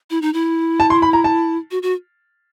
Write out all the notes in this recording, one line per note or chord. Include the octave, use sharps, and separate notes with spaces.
E4
D#4
E4
A5
C6
B5
A#5
A5
F#4
F#4